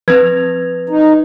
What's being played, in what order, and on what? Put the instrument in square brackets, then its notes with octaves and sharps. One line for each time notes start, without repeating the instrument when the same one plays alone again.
[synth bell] F3 C4 F7 [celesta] B4 G#6
[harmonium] D#4